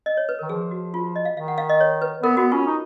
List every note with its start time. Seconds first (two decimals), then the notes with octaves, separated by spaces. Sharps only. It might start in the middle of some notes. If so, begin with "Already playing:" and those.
0.06 D#5
0.17 C#5
0.29 B4
0.39 D#3 A#4
0.49 F3 G#4
0.71 F#4
0.94 F4
1.16 D#5
1.25 F5
1.36 D#3 F5
1.48 F#5
1.58 F5
1.69 D#5
1.80 C#5
2.02 B4
2.23 B3 A#4
2.37 B3 F#4
2.52 C#4 F4
2.67 D#4